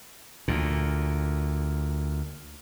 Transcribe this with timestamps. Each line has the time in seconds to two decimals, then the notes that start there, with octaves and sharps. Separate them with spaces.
0.48 D2 A#2